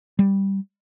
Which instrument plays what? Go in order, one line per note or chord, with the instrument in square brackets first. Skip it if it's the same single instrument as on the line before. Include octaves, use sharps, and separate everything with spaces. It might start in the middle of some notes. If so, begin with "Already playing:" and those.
[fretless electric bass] G3